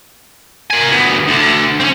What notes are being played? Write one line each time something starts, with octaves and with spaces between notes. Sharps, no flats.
A#3 G#5
D2 B3
D2 D3
C4 C#4